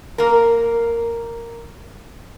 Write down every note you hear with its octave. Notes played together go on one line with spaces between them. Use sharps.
A#3 A#4